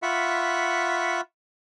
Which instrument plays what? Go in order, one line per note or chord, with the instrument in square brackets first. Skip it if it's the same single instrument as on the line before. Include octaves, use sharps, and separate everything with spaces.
[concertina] F4 E5 F#5 B5 C#6